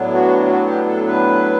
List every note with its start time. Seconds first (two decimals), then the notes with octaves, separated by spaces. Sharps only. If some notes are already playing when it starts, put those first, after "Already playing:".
Already playing: A2 F#3 B3 D4
0.14 F#4
0.46 F#4
0.66 G4
0.86 A4
1.06 B4